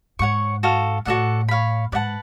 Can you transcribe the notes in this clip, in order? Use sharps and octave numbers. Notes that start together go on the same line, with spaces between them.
G#2 C#5 F#5 C#6
F#4 A4 F5
A2 F#4 A4 D5 F#5
C#5 F5 B5
G#2 B4 D5 F#5 A5